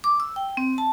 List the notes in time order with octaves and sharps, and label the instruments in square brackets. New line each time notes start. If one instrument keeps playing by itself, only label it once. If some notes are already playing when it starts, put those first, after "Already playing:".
[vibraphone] D6
E6
G5
C4
A5